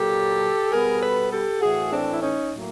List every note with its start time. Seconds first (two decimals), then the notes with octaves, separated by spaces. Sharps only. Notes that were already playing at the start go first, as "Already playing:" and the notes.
Already playing: A#2 F#3 A#3 G4 A4
0.72 B2 G3 B3 G#4 A#4
1.01 A4 B4
1.32 G4 A4
1.61 A2 E3 A3 F#4 G#4
1.92 C4 D4
2.12 E4
2.22 C#4 D#4
2.52 A2 F#3 A#3